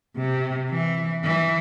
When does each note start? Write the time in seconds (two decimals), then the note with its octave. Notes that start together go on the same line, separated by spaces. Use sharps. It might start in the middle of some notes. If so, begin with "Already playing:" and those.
0.17 C3
0.70 E3
1.24 E3